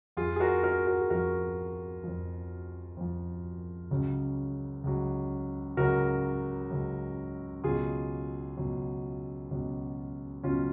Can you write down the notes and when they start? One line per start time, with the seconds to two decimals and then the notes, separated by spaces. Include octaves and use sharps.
0.17 F2 F3 F4 G#4
0.36 G#4
0.40 F#4 A#4
0.64 F#4 A#4
0.87 F#4 A#4
1.00 G#4
1.10 F2 F3 F#4 A#4
2.04 F2 F3
2.97 F2 F3
3.91 C#2 C#3 F#3
4.84 C#2 C#3 F#3
5.77 C#2 C#3 F#3 F#4 A#4
6.71 C#2 C#3 F#3
7.64 C#2 B2 F#3 F4 G#4
8.57 C#2 B2 F#3
9.51 C#2 B2 F#3
10.44 C#2 B2 F#3 C#4 F4